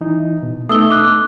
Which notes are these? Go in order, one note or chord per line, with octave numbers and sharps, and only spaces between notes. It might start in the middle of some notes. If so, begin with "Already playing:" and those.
E3 D#4 E4
B2
A3 B3 D#4 D#6 E6 G7
D6 F#6